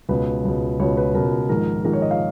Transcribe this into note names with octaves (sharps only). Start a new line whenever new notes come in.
C#2 B2 B4
C#2 B2
C#2 B2 C#5
B4
C#2 B2 A#4
A#1 G#2 D#3 A#4
A#1 G#2 D#3 A#4
C#5
D#5
F5